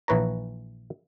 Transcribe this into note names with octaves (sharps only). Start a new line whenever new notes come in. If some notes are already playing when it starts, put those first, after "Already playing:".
A#1 E3 B4 C#5 A#5